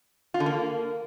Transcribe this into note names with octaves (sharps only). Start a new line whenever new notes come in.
F4
D3
A#3